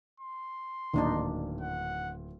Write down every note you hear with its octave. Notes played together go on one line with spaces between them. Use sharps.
C6
D1 A#2 D#3 D4 D#4
F#5